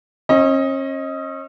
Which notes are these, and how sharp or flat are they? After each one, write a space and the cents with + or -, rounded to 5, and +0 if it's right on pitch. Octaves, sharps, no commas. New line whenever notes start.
C#4 -40 D#5 +15